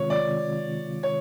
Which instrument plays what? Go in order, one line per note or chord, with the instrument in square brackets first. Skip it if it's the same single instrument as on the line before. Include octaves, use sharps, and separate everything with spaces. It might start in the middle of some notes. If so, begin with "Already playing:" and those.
Already playing: [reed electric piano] C3 D#3 G#3 C4 F4 [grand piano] C#5
[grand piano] D5
C#5